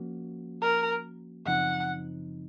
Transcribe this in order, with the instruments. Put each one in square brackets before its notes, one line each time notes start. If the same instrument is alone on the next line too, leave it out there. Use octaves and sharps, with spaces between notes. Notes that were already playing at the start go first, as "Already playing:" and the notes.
Already playing: [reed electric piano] F3 A#3 C#4 F#4
[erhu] A#4
[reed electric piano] F#2 C#3 F3 C4 D#4 [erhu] F#5